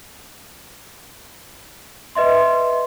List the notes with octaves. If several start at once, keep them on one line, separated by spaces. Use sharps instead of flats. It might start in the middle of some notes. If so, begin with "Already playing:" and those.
B4 D#5 E5 C6